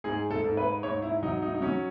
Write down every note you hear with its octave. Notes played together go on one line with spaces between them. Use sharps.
G#2 G#4
A4
G#2
B4
G#2 C#5
E4
F#3 D#4
D#4
D#4
F#3 C#4